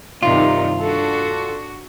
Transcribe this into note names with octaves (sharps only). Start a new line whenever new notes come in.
G2 C3 D#3 D#4 F4 D5
D4 F#4 A4